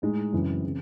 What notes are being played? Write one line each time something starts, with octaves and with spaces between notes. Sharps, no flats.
A2 G#3 D#4
F#2 C#3 E3 C4
C#3 E3 C4